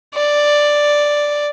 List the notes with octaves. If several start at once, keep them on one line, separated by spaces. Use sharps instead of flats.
D5